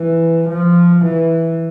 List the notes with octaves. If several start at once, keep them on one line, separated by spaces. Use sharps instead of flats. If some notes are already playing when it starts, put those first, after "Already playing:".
Already playing: E3
F3
E3